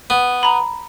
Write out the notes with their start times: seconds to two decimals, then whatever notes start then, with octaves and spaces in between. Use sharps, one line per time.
0.10 B3
0.43 A#5 B5